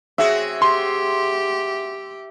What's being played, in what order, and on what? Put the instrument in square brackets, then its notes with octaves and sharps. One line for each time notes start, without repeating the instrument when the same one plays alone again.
[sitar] C4 F#4 G#4 [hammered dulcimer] E5
[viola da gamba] G4 [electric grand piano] C6